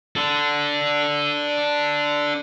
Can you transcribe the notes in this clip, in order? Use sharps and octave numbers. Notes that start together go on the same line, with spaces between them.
D4 A4